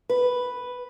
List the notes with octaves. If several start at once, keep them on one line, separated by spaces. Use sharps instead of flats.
B4